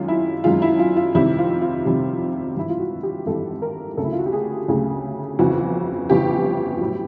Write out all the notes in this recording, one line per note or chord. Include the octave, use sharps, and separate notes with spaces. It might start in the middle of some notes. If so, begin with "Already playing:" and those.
Already playing: F#2 D#3 G#3 F4
E4
F#2 D#3 G#3 F4
E4
F4
F4
F2 C3 D#3 G3 E4
F4
F4
F2 C3 D#3 G3
G#1 G2 E3 G3 E4
F4
F#4
G4
G#1 G2 E3 G3 A4
A#4
D2 C#3 F#3 A3 A4
E4
F4
F#4
G4
G#4
D2 C#3 F#3 A3 G#4
G1 F2 C#3 E3 F#4
G1 F2 C#3 E3 G4
A2 F#3